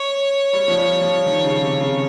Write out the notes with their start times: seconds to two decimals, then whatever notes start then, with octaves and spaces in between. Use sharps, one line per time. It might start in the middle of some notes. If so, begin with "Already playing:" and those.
Already playing: C#5
0.53 G3
0.68 F3
0.78 G3
1.01 F3
1.26 D#3
1.44 C#3
1.63 C3
1.80 C#3